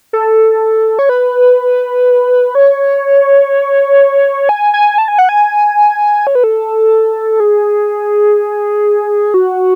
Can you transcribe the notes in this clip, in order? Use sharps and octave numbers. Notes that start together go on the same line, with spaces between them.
A4
C#5
B4
C#5
G#5
G#5
A5
G#5
F#5
G#5
C#5
B4
A4
G#4
F#4